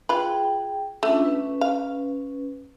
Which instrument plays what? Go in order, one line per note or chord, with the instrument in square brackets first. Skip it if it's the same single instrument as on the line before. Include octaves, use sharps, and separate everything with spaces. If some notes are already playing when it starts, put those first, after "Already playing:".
[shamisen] F4 B4 [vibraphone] G#4 G5
[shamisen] A3 [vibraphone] C#4 D4 F4
[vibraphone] C#4 B4
[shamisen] F5